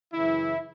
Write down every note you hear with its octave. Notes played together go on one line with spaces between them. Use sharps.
F#2 C#3 E3 E4